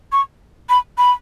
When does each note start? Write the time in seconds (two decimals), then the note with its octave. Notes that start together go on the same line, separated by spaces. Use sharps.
0.12 C#6
0.69 B5
0.98 B5